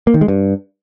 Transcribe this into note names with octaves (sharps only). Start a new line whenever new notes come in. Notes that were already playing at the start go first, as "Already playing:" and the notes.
A#3
D#3
G#3
G2